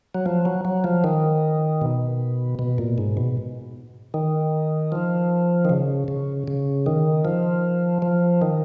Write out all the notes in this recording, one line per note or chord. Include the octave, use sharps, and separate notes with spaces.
F#3
F3
F#3
F#3
F3
D#3
B2
B2
A#2
G#2
B2
D#3
F3
D#3
C#3
C#3
C#3
D#3
F3
F3
D#3